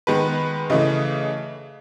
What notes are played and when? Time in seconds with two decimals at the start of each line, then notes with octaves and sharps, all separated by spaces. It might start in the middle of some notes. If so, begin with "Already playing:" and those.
0.07 D#3 G#3 B3 B4
0.70 C#3 E3 A3 D#5